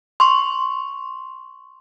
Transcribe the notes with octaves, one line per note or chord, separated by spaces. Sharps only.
C6 C#6